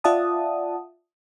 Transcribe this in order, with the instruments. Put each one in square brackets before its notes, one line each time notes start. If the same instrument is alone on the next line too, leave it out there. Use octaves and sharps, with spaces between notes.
[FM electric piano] F4 D5 E5 F#5 A5 D#6